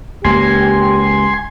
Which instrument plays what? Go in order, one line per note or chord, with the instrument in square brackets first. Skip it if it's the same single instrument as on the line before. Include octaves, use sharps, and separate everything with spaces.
[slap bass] C#2 A#3 [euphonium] G4 [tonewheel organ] G#5 C6